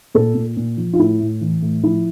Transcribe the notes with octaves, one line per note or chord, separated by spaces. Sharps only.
A#2 A4
A#2
A#2
F3
F4
A2 E4
A2
E3
A2
F3 E4